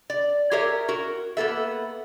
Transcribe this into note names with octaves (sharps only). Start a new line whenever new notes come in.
D5
G4 G#4 A#4 C#5 E5
F#4 A#4
A#3 B3 A4 E5